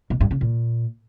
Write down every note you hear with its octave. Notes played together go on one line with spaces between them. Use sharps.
B2
G2
C#3
A#2